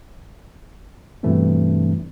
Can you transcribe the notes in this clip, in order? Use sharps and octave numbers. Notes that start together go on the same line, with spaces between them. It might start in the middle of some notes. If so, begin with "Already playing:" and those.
G2 B2 E3 A3 C4 D4